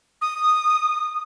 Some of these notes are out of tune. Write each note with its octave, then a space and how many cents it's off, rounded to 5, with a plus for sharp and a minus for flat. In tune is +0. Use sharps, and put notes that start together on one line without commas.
D#6 -10